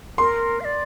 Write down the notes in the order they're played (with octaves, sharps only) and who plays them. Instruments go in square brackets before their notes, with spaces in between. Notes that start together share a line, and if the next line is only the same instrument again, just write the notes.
[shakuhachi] A#4 [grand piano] C6
[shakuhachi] F5
D5